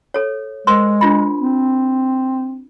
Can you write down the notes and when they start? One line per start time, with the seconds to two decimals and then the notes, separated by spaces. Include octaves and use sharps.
0.14 A4 C#5
0.67 G#3 A#4 C5 C6
1.01 D4 F4 B5
1.40 C4